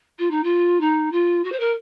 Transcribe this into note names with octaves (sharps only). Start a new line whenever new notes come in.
F4
D#4
F4
D#4
F4
F#4
C5
A#4